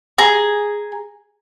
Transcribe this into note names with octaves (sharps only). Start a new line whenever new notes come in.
G#4 A#5